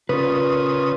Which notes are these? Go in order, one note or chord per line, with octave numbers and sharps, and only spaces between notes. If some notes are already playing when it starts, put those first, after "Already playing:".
A#2 C#3 F4 B4 D#6